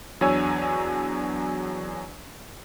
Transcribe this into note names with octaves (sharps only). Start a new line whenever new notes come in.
E2 F#3 D4 C#5 G#5 E6